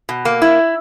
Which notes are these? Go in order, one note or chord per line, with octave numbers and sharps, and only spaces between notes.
B2
A#3
E4